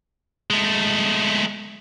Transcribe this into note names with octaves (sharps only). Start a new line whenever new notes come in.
G#3 A3